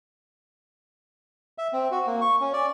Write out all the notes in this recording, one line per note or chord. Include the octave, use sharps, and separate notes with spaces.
E5
C4
F#4
A#3
C#6
C#4
D5